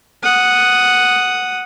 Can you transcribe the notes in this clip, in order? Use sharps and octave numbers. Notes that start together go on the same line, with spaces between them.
F#5 D#6